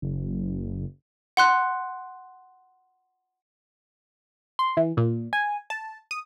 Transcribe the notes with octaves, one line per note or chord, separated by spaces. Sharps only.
F#1
F#5 C6 F#6
C6
E3
A#2
G#5
A5
D#6